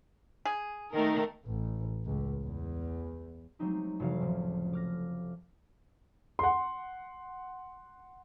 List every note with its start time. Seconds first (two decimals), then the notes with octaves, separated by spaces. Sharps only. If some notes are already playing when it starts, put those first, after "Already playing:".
0.45 G#4
0.93 D#3 A3 D#4 A#4
1.43 A1
2.04 C#2
2.42 E2
3.59 F#3 G#3 A3 C4 D#4 G4
4.00 F1 C3 E3 F#4 C#5 F5
4.21 C#2 A2 F3
4.73 D6 F6 A#6
6.39 F#5 C6